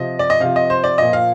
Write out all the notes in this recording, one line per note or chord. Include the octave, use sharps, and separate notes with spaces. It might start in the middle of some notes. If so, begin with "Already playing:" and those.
Already playing: C3 F3 D#5
D5
D#5
C3 F3 F5
D#5
C5
D5
A#2 F3 D#5
F5